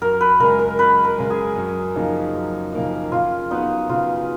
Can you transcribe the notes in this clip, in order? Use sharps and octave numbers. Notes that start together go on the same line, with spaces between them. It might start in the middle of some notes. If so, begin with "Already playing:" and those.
F#2 A#4
B4
C#3 G#3 A#4
A#4
F#2 B4
A#4
C#3 G#3
G#4
F#2
C#3 F3 A#3 D#4
F#2
C#3 F3 A#3 D#4
C#3 F4
F#3 B3 D#4 F#4 B4
C#3 F4